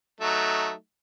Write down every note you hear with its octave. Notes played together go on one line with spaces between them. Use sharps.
F#3 A3 D#4